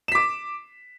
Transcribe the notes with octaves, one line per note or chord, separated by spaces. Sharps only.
D6 B6 E7